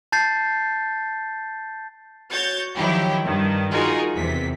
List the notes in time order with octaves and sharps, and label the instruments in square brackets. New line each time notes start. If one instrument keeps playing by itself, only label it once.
[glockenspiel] A5 G6 A6 C7
[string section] F#4 C#5 G6 A6
D#3 F3 F#3 E4 G4
G2 D#3
D#4 F4 F#4 G#4 A#4
E2 C3 E3 B6